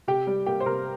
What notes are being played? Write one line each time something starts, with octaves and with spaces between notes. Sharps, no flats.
C3 G4 G5
G3
A#3 G4 G5
C5
C3 A#4